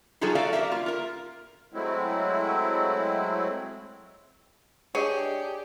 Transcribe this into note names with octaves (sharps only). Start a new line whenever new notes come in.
F#3 G3 D#4 F4 G#4 A4
F#4 A4 D5 E5 F5
G4 A#4 E5
A#3 F4
F4 A#4
F#3 G#3 A3 C4 E4
D4 G4 G#4 C#5 D#5